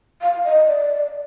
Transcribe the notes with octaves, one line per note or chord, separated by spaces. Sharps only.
F5
D#5
D5